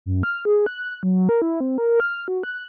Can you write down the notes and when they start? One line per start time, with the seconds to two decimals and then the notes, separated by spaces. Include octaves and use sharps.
0.06 F#2
0.23 F6
0.45 G#4
0.66 F#6
1.03 F#3
1.29 A#4
1.42 E4
1.60 C4
1.78 A#4
2.00 F6
2.28 F#4
2.43 F#6